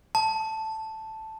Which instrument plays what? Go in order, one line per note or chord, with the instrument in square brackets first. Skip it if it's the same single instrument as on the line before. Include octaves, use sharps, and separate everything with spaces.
[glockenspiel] A5